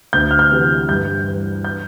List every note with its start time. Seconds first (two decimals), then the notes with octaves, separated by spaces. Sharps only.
0.13 D2 G6
0.31 F6
0.39 G6
0.51 C3 E3
0.89 G2 G6
1.27 E3
1.64 G6